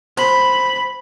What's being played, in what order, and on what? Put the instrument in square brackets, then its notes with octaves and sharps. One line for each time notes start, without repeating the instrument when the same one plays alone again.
[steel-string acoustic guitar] C5 [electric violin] B5